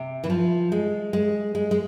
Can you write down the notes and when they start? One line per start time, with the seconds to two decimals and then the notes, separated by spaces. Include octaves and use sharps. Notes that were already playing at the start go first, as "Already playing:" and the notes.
Already playing: C3
0.24 E3
0.30 F3
0.72 G#3
1.13 G#3
1.55 G#3
1.71 G#3